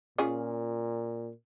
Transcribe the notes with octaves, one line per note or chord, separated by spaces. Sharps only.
A#2 C#4 F4 G#4